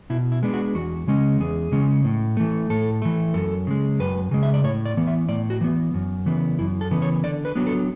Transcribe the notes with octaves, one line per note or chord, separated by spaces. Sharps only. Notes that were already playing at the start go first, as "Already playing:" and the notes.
B2 E4
E4
G#3 B3 D4
F#4
E2 F#4
C#3 G#3 C#4
E2 G#4
C#3 G#3 C#4
A2
E3 A3
A2 A4
E3 A3
F#2 A4
C#3 G#3
F#2 B4
C#3 G#3
E5
D5
A2 C#5
D5
E3 B3
E5
A2 D5
F#4
E3 B3
F#2
C#3 E3 B3
F#2 E4
A4
C#3 E3 B3
C#5
D3 D5
B4
F#3 B3 D4
A4